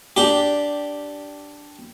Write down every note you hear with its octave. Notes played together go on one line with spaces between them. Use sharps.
D4 G4